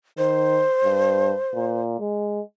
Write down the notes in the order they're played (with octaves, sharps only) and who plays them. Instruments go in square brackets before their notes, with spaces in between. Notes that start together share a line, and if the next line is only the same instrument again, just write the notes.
[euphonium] D#3 [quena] C5
[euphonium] G2
A#2
G#3